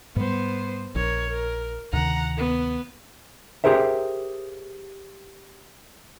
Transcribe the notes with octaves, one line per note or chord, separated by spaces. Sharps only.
G#2 G3 B3 C5
A#1 A#4 C#5
A#4
D2 C3 D#3 F#5 A#5
B3
G4 G#4 A#4 C5 E5